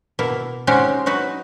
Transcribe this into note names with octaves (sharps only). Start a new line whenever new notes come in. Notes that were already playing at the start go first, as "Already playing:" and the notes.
B2 A#3 E4
G#3 C4 C#4 D#4 F#4 G4
F#3 D#4 F#4 B4